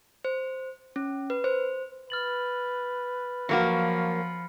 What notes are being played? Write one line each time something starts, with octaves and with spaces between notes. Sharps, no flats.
C5
C#4
B4
C5
B4 F6 A6 F#7
F3 F#3 A#3 F#4 B5 F6 C#7